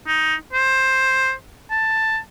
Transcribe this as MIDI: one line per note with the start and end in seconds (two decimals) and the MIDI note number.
0.07 0.35 63
0.53 1.32 72
1.70 2.18 81